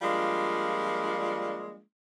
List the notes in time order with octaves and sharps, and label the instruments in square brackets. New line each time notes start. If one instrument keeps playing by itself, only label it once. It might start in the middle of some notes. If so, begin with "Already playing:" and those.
[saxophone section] F3 G3 G#3 A#3 D4 F4